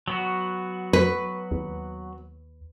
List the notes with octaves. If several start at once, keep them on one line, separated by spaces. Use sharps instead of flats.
F#3 B3 F#4
B4
D#2